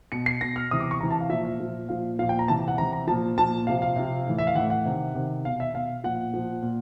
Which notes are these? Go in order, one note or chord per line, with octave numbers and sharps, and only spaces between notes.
B2 C#7
C7
B2 A#6
F6
C3 E3 D#6
D6
C#6
C3 E3 A#5
A5
F5
A#2 F3 E5
E5
A#2 F3
A#2 F3 F5
A#2 F3 F5
G5
A#5
C3 E3 A5
F#5
C3 E3 A#5
A#5
A#2 F3 A5
A#2 F3 A5
C3 F3 F5
F5
C3 F3
A2 E3
E5
F5
A2 E3 F#5
F#5
C3 D#3
C3 D#3
B2 F5
E5
B2 F5
A#2 F3 F#5
A#2 F3
A#2